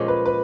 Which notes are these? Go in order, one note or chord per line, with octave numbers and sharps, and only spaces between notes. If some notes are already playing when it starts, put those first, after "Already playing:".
Already playing: A#2 F3 G#3 C#4
B4
B4